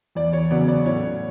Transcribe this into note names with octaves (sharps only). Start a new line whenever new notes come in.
E2 D5
C#5
C#3 F#3 B3 D5
D5
A2 C#5